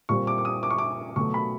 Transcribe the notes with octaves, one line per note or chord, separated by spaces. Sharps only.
A#2 G3 C4 C#6
D6
D6
D#6
D6
C#6
D6
B2 F#3 A3 C#6
B5